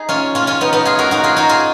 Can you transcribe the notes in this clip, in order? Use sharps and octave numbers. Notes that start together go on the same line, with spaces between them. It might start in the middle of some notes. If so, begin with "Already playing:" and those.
Already playing: D#4 G#4
C#4 F4
C#4 F4
C#4 F4
B3 D#4
B3 D#4
F4 G#4
F#4 A#4
D#4 F#4
F4 G#4
D#4 F#4
F4 G#4